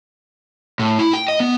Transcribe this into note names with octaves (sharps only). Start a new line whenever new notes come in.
A2
E4
G5
D#5
B3